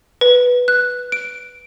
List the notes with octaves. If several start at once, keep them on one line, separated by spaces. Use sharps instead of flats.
B4
F#6
D7